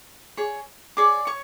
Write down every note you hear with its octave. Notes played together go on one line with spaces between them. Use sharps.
G#4 C#5
G#4 C#5 D5 D6
C#5 C#6